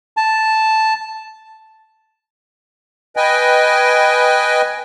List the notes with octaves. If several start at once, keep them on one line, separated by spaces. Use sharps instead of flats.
A5
B4 D#5 G5 G#5